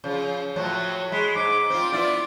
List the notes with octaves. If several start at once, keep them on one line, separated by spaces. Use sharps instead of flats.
C#3 F3
A2 F3 F#3 F#4
G#3 B5
G#2 D6
C4 F4
B3 E4 F4 D5